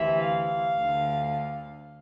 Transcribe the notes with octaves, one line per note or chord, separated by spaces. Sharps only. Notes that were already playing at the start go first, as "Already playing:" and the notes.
Already playing: D2 C3 E3 E5
F5
D2 D3